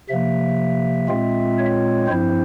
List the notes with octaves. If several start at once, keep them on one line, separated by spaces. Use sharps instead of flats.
C3 F3 A#3 E5
A#2 G#3 C4 F4
C#5
G2 F3 C4 E4 C5